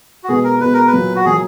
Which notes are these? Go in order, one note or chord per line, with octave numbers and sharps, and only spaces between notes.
F#4
B2 G#3 B3 G#4
A#4
B2 G#3 B3 B4
A#4
B4
A#2 F#3 A#3
F#4
A#2 F#3 A#3 G#4